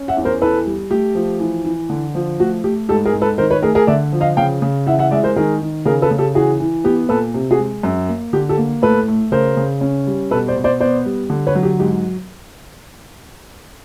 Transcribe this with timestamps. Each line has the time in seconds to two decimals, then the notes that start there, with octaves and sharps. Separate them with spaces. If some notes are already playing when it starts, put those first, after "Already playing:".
Already playing: C#4
0.08 E5 F#5
0.17 E2
0.25 A#4 C5
0.41 E3 A4 B4
0.66 G3
0.90 A3 G4
1.15 F3
1.40 E3
1.65 E3
1.89 D3
2.15 F3
2.39 A3 F#4
2.64 A3 G4
2.89 G#2 G4 A4
3.05 G#4 A#4
3.13 G#2
3.21 A4 B4
3.38 D#3 A#4 C5
3.50 B4 C#5
3.62 A3 G#4 A#4
3.75 G#4 A#4
3.87 D3 D5 E5
4.12 F3
4.21 D#5 F5
4.37 C#3 F5 G5
4.62 C#3
4.87 E3 E5 F#5
4.99 E5 F#5
5.11 G#3 D5 E5
5.23 A#4 C5
5.36 D#3 G#4 A#4
5.61 D#3
5.85 C#3 G#4 A#4
6.02 A4 B4
6.11 C#3
6.18 G4 A4
6.35 E3 F#4 G#4
6.60 E3
6.84 B3 G4
7.09 A#2 A4 B4
7.34 C3
7.51 F#4 G#4
7.59 G#3
7.83 F#2
8.09 A#3
8.33 D3 G4
8.49 G4 A4
8.58 A#3
8.82 A2 A4 B4
9.08 A3
9.32 C#3 A#4 C5
9.57 C#3
9.81 C#4
10.07 G3
10.31 B2 A4 B4
10.48 C5 D5
10.56 B2
10.64 C5 D5
10.80 B3 C5 D5
11.05 G3
11.30 D3
11.47 B4 C#5
11.55 F#3
11.63 G4
11.79 G#2 G4